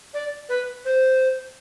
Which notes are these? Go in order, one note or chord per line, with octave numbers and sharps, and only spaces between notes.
D5
B4
C5